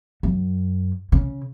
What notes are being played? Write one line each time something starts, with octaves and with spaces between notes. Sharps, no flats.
F#2
C#3